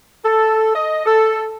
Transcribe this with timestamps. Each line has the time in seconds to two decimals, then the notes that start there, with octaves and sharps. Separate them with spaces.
0.24 A4
0.75 D#5
1.06 A4